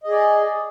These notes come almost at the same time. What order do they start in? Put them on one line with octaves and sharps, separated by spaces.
D#5 G#4 D5